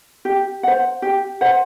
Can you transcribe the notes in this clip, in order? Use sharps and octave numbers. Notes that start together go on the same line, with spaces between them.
G4
C5 F#5
G4
C5 F#5